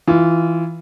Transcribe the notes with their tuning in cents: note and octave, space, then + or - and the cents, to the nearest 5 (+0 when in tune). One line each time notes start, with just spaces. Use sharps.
E3 +0 F4 -15